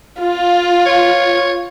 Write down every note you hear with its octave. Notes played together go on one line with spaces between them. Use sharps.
F4
C#5